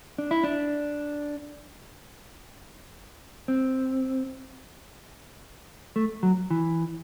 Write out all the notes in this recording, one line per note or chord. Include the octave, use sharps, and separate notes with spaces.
D4
E4
D4
C4
A3
F#3
E3